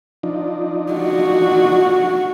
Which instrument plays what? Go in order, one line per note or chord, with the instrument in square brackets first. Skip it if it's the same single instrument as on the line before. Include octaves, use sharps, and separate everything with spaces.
[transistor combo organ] F3 D4 D#4
[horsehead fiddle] F#4